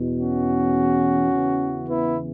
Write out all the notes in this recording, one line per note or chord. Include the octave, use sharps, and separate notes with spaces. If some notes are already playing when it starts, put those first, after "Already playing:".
Already playing: E2 B2
C#4 F#4
E2 C#3 E3
B3 E4